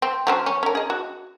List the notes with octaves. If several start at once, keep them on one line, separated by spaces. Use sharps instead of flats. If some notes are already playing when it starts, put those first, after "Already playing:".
C4
F#3 C#4 C5
C#4
C#4 A#4
G#4 D#5
F#4